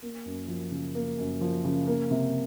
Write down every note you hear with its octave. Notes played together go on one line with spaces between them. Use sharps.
A#3
F#2
F3
C#3
A#3
F#2
F3
C#3
A#3
C3